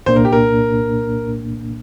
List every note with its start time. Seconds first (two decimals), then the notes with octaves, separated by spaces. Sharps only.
0.06 C2 A#2 A#3 D4 C5
0.16 A#4
0.25 G4
0.33 A#4